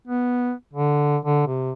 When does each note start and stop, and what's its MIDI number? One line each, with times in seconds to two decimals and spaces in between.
0.07 0.52 59
0.73 1.17 50
1.25 1.45 50
1.47 1.72 48